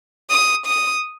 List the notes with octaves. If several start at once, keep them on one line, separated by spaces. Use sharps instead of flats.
D#6
D#6